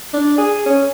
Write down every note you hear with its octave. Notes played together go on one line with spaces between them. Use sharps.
D4
G#4
C#4